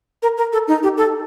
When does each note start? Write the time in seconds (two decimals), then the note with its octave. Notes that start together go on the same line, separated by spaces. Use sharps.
0.23 A#4
0.37 A#4
0.53 A4
0.68 D#4
0.83 G4
0.97 A4